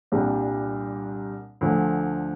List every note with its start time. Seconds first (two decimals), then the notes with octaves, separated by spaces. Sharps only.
0.12 C2 A#2 G3 D4 G4
1.61 D2 D3 F3